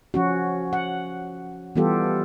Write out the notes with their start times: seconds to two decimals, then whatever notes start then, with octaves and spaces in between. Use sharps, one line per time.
0.14 F3 C#4 F#4
0.73 F#5
1.76 E3 G3 B3 F4 G4 A4